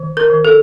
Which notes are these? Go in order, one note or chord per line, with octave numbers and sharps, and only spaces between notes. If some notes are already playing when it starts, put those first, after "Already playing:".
Already playing: D#3
A#4
D#3
A4